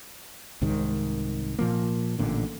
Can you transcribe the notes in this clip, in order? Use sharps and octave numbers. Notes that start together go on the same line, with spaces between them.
C2 G#2 D#3
A#2 F3 A#3
A1 A#2 D3